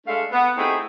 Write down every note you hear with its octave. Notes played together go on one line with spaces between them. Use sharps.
G#3 A3 D4 A4 F5
B3
A3 C4 D#4 E4 G4 G#4